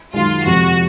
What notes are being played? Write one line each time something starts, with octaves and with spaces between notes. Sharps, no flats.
F#2 D#3 G#3 F4
F2 C3 F3 G#3 F#4